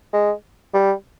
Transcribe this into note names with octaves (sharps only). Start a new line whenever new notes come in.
G#3
G3